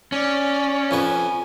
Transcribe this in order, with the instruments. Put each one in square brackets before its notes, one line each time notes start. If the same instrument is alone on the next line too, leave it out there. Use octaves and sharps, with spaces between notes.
[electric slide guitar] C#4 [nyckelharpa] D5
[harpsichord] F2 F3 B4 [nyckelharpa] G#5